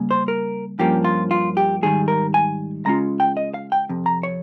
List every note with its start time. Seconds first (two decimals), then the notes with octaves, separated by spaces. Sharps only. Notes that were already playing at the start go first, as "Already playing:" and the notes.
Already playing: C#3 G3 A#3 C#4
0.11 C5
0.28 A#4
0.79 G2 F3 A#3 C#4 G4
1.04 F4
1.31 F4
1.57 G4
1.82 G#2 D#3 G3 G#4
2.08 A#4
2.34 G#5
2.86 C#3 G#3 C#4 F4 A#5
3.20 G5
3.37 D#5
3.54 F5
3.72 G5
3.89 F2 C3
4.06 A#5
4.23 C#5